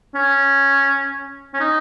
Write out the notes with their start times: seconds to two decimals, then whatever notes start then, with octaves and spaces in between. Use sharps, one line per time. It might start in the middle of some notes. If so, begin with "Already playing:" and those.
0.15 C#4
1.54 C#4
1.60 D#4